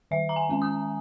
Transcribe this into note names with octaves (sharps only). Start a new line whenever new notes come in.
D#3 E5
A#5
G#5
G#3 C#4
D#6